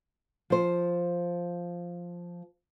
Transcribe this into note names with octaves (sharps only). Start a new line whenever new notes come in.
F3 C5